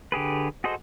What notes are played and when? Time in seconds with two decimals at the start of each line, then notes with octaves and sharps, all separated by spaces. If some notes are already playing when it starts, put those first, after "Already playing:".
0.12 D3 G4 G#4 B4
0.64 F#4 G#4 A4 C5 D#5